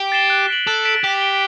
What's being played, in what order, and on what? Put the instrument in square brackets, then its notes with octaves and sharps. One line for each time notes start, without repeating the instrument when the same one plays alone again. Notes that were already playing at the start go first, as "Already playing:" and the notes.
Already playing: [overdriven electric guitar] G4
[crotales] A6 C7 E7 G7
F#6
B6 D7 F#7
[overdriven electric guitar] A4 [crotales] F#6
[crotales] B6 D7 F#7
[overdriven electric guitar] G4 [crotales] A6
[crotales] D7 G7